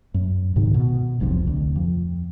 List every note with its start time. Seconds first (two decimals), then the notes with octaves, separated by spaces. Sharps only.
0.14 F#2
0.56 C#2 G#2 C3 D#3
0.74 B2
1.20 E1 B1 F2 C3
1.47 D2
1.76 F2